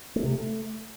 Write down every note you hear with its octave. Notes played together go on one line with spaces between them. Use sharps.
A3
C3
A3